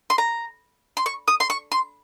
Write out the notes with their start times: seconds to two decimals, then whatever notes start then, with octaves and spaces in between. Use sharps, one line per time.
0.10 C6
0.18 A#5
0.97 C6
1.06 C#6
1.28 D#6
1.40 C6
1.50 C#6
1.72 C6